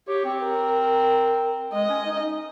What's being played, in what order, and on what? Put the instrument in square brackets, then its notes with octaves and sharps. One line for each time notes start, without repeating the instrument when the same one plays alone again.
[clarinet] G4 [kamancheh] C#5
[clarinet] C4
[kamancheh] A#4
[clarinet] G#3 [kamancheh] D#5
[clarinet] C#4
D#4